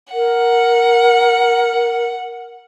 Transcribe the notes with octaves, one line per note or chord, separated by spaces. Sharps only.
A#4 F#5